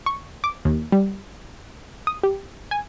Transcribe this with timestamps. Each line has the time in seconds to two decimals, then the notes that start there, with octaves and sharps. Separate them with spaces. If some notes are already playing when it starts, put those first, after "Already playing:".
0.06 C#6
0.44 D6
0.65 D#2
0.92 G3
2.07 D#6
2.23 G4
2.71 G#5